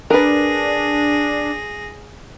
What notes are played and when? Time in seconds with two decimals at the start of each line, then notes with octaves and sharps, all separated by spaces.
0.10 D4 G#4 A#4 B4 A#6